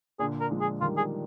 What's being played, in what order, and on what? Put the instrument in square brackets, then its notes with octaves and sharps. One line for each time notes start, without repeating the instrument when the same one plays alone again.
[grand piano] A#2 D3 [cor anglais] G#4
[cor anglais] A#4
[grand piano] F3 G#3
[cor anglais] G#4
[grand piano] D#3 G3 [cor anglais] F4
[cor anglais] G#4